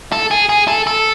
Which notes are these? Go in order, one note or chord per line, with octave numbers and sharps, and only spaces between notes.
A4
G#4
G#4
A4
A4